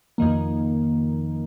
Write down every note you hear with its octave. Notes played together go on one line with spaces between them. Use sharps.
F2 D#3 A#3